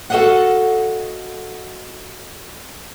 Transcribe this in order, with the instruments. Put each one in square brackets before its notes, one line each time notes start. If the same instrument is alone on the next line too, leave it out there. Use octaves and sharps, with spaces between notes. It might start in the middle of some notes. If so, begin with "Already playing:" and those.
[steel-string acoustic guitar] F#4 A4 C5 D#5 F5 F#5